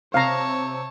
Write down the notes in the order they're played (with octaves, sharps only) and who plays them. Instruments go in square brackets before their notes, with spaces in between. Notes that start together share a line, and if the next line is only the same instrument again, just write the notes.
[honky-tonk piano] C3 [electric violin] C#5 A5 [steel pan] F5 A#5